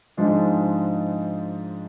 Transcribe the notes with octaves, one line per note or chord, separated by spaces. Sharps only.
G#2 F3 G#3 D4 F4